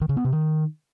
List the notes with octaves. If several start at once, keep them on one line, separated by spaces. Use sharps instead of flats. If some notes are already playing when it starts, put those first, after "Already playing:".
D#3
C#3
B3
C3
D#3